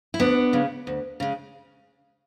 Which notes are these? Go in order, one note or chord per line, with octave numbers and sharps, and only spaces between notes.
E4
D2 B3 D4
C#3 G#3
D2
C#3 G#3